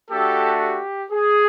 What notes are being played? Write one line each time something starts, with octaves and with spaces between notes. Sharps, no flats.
A3 D4 F#4 G4 A4
G4
G#4